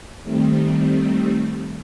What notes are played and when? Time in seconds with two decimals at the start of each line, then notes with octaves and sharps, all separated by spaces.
0.23 D#3 G3 A3 C4